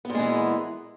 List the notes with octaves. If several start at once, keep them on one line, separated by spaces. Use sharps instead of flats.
A#2 E3 G#3 B3